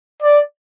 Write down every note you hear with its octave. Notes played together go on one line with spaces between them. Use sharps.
D5